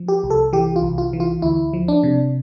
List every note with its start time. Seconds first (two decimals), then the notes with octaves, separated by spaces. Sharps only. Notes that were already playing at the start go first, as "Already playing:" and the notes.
Already playing: F3
0.08 G4
0.24 C2
0.30 A4
0.53 E3 G4
0.76 F4
0.82 C2
0.98 F4
1.13 E3
1.20 F4
1.42 D2 E4
1.73 F3
1.88 D4
2.03 C3